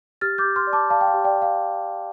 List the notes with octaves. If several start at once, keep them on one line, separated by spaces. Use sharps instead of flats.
G4 F6 A6
D6 G6
G4
C6 F6
D5
A5 D6
D5 F5 A5
G5
F5
G4
D5 G5
D5
F5